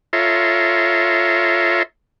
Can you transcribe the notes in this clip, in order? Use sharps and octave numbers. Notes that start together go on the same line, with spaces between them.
F4 A4 C#5 E5 A#5 C6